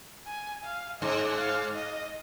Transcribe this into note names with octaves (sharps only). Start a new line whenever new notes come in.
G#5
F5
G#2 D#5
F5
D#5